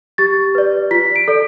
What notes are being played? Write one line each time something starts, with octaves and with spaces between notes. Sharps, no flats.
G4 A6
B4 D5
F4 B6
D7
A4 D5